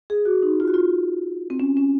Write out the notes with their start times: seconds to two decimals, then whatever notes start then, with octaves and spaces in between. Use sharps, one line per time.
0.10 G#4
0.25 F#4
0.43 D#4
0.60 F4
0.68 F#4
0.74 F4
1.50 C4
1.60 C#4
1.77 C#4